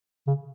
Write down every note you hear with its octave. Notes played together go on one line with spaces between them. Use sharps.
C#3